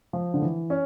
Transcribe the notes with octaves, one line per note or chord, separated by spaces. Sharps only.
F3
D3
E3
C#4